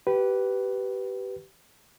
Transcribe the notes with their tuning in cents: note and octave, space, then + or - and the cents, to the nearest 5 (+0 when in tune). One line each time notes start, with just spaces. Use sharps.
G4 -20 B4 +0